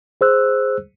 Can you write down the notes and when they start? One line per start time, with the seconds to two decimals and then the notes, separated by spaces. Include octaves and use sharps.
0.21 G#4 C5 E6 F#6